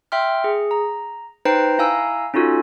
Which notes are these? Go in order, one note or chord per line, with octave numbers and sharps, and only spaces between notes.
E5 G5 C6 F6
G#4
A#5
D#4 B4 C5 G5 A#5 C7
E4 F5 G#5 A#5 E6
C#4 D#4 F4 F#4 A4